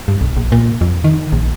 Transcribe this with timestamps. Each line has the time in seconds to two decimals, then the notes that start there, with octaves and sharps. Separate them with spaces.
0.08 G2
0.21 B1
0.37 A#1
0.52 A#2
0.81 F2
1.04 D#3
1.32 A#1